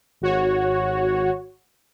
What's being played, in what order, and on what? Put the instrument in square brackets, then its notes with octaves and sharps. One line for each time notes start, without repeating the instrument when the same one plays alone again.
[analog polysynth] G#1 F#4 C#5